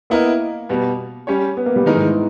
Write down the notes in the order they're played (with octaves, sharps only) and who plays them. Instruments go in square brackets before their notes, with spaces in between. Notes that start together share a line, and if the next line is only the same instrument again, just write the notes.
[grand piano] A#3 [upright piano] B3 E4 A#4 D#5
[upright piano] B2 G3 B3
G3 C#4 G4 C#5
[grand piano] B3
A#3
G3
[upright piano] D#3 G#3 D#4 A#4 [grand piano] E3
[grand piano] G#2